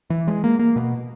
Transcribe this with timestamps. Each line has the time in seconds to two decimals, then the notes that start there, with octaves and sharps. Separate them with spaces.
0.10 E3
0.27 G#3
0.44 A#3
0.59 A#3
0.76 B2